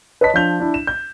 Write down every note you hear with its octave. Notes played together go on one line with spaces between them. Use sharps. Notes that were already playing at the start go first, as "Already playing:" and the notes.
B4 C#5 D#5 A5 B6
F3 D4 G6 F7
D4 E4
E7
G6